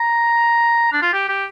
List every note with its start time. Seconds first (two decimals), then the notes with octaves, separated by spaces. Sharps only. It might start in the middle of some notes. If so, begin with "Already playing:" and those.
Already playing: A#5
0.93 D4
1.02 F4
1.13 G4
1.29 G4